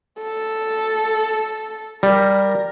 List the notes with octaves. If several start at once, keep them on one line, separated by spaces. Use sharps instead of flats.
A4
G3 A#4